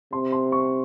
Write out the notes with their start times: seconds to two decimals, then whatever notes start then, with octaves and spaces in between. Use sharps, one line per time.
0.13 C3 C6
0.32 C6
0.52 C#6